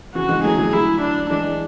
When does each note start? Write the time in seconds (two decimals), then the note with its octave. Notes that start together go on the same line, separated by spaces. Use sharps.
0.15 C#3 E3 F#4
0.29 E3 G#3
0.43 F#3 A3 G#4
0.58 D3 F#3
0.73 E4
1.01 D4
1.30 E3 G#3 D4